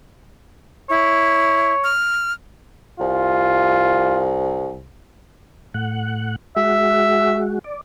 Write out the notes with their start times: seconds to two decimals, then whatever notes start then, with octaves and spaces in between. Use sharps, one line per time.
0.90 E4 C#5
1.84 F6
3.00 C2 F4
5.74 A2 F#5
6.56 G#3 F#4 E5
7.64 D5